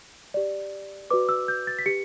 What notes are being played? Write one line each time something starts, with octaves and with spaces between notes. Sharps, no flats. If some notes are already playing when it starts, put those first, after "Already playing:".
G4 D5
F#4 B4 D5 D6
E6
G6
A6
B6
G4 B4 C#7